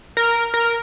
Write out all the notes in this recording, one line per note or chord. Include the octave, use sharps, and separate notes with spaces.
A#4
A#4